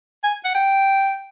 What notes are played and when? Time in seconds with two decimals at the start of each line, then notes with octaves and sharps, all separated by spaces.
0.24 G#5
0.44 F#5
0.55 G5